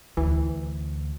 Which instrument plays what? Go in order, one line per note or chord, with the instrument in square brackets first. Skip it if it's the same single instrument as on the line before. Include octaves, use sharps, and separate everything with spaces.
[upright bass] D2 [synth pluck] E3